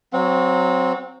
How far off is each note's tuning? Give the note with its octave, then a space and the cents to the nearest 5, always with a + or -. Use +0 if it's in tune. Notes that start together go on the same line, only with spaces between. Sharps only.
F#3 +0 C4 -5 F#5 -40